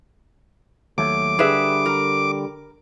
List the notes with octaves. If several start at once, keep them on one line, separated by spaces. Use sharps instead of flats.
D#2 F#3 A3 D6
D3 G3 G#4 B4 E5
A#4